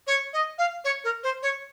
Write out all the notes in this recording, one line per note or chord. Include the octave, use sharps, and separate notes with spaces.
C#5
D#5
F5
C#5
A#4
C5
C#5